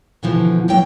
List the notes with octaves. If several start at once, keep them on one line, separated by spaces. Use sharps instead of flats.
B2 D3 E3 F3
G2 F#3 A#3 G5